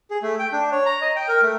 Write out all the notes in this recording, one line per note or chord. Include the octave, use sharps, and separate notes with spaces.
G#4
A3
G5
D4
C#5
A#5
D#5
G5
A#4
A3